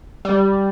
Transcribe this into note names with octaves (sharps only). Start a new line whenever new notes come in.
G3